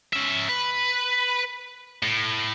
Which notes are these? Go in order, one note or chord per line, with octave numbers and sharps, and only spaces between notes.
C#4 E5
B4
A2